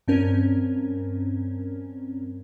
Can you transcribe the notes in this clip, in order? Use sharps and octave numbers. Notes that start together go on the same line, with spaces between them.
G2 C4 C#4 A#4